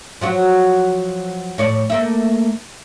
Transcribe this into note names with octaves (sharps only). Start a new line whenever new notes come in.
F3 F#3 F#4
A2 C#5 D5
A3 A#3 E5